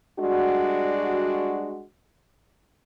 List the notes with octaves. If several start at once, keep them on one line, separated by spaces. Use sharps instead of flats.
G3 G#3 D4 F#4